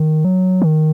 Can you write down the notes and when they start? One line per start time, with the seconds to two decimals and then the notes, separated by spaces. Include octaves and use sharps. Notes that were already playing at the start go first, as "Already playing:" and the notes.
Already playing: D#3
0.25 F#3
0.62 D#3